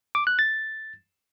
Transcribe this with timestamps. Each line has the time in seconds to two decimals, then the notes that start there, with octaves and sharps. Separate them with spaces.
0.15 D6
0.27 F#6
0.39 A6